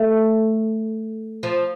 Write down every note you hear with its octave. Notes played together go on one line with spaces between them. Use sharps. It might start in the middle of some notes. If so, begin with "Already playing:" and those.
Already playing: A3
F3